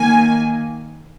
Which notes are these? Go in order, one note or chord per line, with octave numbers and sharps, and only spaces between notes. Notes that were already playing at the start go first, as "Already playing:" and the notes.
Already playing: D#3 A#3 G#5